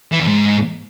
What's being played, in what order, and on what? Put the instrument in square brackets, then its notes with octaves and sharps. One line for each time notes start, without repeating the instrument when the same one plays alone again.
[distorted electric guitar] E3
E2
G#2